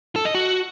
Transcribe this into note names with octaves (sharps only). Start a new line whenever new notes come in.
A4
D#5
F#4